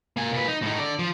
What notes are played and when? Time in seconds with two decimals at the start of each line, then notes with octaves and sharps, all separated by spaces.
0.17 A#3 G#5
0.32 A#2 B4
0.48 D#4
0.62 A2 D#4
0.78 D3 D5
0.99 F3